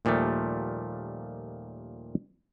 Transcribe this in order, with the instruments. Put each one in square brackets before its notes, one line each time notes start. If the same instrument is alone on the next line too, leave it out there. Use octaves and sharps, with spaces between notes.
[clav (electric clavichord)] D#2 A#2 F3 G3 A3